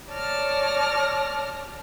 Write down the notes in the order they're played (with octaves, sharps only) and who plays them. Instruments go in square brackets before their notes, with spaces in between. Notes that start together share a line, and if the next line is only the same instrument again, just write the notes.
[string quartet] C#5 D5 A5 F6 A#6